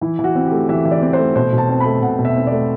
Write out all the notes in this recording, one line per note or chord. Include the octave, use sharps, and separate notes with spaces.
E3 E4
E3
F#4
C4
G4
A3
E3 E5
E3
D5
C4
C5
A3
B2 C5
B2
A5
C4
B5
A3
B2 F#5
B2
E5
C4
D5
A3